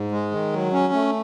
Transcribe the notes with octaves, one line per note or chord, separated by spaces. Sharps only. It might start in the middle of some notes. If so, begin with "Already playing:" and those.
Already playing: G#2
G#3
D#3
F#3
C#4
A3